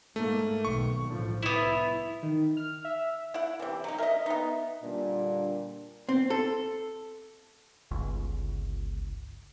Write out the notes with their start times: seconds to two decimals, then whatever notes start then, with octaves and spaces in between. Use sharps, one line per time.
0.16 G#2 A3 A#3
0.65 B1 D#3 C#6
1.08 A2 D3 F3
1.43 C2 B3 E4
2.23 D#3
2.57 F6
2.85 E5
3.34 E4 F#5
3.60 C3 E3
3.84 F#3 D#4
3.98 A#4 D#5 E5
4.26 B3 D#4
4.84 A#2 D3 G3 D4
6.09 C4
6.30 A4
7.91 G1 C#2